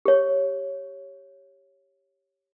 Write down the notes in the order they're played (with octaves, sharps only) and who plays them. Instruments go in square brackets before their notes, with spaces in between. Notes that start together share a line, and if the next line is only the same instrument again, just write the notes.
[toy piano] G4 C#5